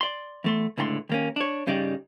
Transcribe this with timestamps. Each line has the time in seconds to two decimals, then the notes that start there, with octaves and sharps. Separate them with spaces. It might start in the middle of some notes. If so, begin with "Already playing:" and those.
0.01 D5 C6
0.44 E2 A3 C6
0.78 C#2 A2 D3 A#5 C6
1.09 D#2 A#3 C#4
1.36 D4 C#5
1.67 G2 C#3 G3 D#4 D5